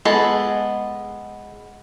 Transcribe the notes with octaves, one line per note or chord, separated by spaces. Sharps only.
G#3 B3 A4